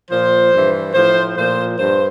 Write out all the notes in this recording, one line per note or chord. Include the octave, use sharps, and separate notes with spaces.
A#2 F3 C5
G2 E3
A2 F3 C5
A#2 F3 C5
G2 C5